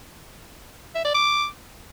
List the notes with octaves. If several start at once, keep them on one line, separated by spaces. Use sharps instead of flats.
E5
D5
D6